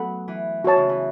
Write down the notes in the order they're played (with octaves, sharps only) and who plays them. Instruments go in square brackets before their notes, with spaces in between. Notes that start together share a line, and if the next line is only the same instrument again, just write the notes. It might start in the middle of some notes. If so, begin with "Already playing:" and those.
Already playing: [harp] F#3 A3 B3 [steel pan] A4 F#5 B5
[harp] E3
[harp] E3 [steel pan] F#4 C#5 A5
[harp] C#3
E3